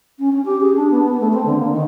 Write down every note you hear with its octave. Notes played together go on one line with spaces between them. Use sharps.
C#4
C#4
G4
G#4
D4
B3
B3
A3
C4
D3
A#3
D#3